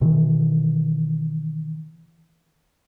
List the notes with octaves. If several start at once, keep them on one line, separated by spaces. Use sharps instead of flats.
B2 D#3 E3